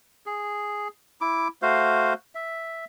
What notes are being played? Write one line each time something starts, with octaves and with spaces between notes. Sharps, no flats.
G#4
E4 D6
A3 F#4 C5 F5
E5